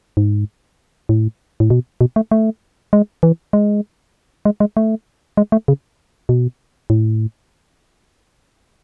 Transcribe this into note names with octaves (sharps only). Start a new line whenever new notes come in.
G#2
A2
A2
B2
B2
A3
A3
G#3
E3
G#3
G#3
G#3
A3
G#3
A3
C#3
B2
A2